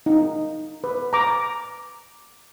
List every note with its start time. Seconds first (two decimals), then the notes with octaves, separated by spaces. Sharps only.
0.06 D#4
0.84 B4
1.13 A#5 D6